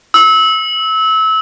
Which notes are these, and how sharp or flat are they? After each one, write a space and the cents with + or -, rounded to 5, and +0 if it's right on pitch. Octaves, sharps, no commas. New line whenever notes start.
E6 -25